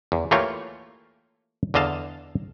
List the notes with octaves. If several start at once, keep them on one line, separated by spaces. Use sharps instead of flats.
E2
E3 A3 A#3 F4 G4 C#5
E2 D3 D#5 F5 A5